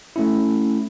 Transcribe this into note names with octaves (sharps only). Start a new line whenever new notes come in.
A3 C#4 E4